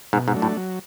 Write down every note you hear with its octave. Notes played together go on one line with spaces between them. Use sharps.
G#2 B2
G#2
F#3 A3 D4
A2
F#3